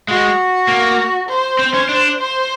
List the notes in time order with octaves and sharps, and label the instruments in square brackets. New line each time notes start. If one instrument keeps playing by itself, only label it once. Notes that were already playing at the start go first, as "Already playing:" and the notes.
[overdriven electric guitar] G#3 [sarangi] F#4
[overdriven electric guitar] A#3
[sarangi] C5
[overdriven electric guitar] C4
C#4
D4
[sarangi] C5